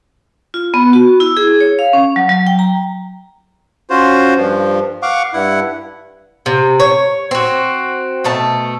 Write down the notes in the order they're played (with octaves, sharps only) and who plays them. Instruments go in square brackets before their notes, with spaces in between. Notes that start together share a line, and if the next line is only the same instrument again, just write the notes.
[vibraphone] F4
B3
F#4
E4
G#4
C#5
F5
C#4
F#3
F#3
G5
A#5
[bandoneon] C#4 F4 F#4 C5
G2 F3
F5 F#5 C#6 D6
G2 E4 F#5
[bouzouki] C3
C#5
C4 F#4
B2 A3 A5